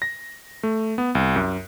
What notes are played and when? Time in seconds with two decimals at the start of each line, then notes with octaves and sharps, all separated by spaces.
0.02 A#6
0.63 A3
0.98 B3
1.15 C2
1.36 F#2